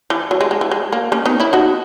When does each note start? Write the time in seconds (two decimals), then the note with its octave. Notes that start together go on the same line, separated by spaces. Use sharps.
0.10 E3
0.31 F#3
0.41 G#3
0.51 G#3
0.61 E3
0.71 G#3
0.92 A#3
1.12 A#3 C#4
1.26 B3 D#4
1.40 C#4 E4
1.53 D#4 F#4